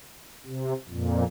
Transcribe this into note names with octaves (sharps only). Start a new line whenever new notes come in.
C3
F2 A#2